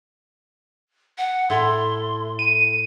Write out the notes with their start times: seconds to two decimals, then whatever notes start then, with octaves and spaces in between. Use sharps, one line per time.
1.18 F#5
1.50 A2 C6
2.39 D#7